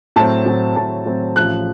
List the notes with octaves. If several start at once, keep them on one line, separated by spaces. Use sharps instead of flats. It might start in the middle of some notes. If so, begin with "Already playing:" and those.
A2 F#3 C4 A5
A2 F#3 C4
A2 F#3 C4 A5
A2 F#3 C4
A1 A2 F3 F#6